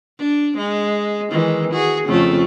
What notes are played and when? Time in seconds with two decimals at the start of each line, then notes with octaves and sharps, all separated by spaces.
0.19 D4
0.58 G#3
1.29 D#3 E3 G#3
1.72 F#4 G#4
2.08 F2 C#3 A3